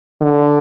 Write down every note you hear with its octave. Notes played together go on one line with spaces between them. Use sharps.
D3